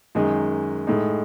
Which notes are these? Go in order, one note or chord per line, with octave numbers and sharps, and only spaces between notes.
F#2 D#3 G#3 D#4 G#4
A2 G#3 D#4